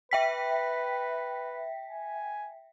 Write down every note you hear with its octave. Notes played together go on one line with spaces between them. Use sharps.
B4 E5 G5 B6
G#5